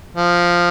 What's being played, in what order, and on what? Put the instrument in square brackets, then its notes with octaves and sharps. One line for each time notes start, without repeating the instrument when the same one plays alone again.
[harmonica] F3